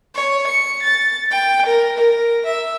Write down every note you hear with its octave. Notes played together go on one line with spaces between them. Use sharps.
C#5
C#7
A6
G5
A#4
A#4
E5